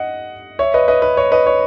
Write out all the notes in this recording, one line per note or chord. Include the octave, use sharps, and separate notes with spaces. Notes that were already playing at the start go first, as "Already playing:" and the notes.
Already playing: D#5 F#5
C#5 E5
B4 D#5
B4 D#5
B4
C#5
B4 D#5
C#5